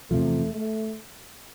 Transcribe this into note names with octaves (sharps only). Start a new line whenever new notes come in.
E2 C3 F3 A3
A3